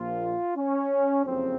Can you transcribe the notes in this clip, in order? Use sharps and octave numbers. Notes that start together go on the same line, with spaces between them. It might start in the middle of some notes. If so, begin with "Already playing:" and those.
Already playing: A#1 A#2 F3 A#3 F4
C#4
F#1 F2 C#3 C4